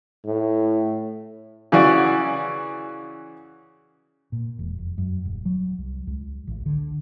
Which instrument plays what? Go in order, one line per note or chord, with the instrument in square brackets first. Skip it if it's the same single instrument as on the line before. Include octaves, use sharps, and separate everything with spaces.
[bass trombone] A2
[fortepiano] C#3 E3 F#4 D5
[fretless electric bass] A#2
E1
F1
F#2
D#1
F#3
C2
C#2
A1
D3